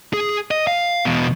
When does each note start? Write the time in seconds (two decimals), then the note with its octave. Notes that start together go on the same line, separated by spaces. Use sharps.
0.13 G#4
0.51 D#5
0.67 F5
1.05 E2 B2